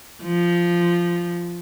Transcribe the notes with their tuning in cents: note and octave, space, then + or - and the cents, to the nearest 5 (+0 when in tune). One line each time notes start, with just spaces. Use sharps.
F3 -10